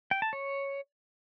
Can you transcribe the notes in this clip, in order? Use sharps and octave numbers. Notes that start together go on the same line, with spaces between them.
G5
A5
C#5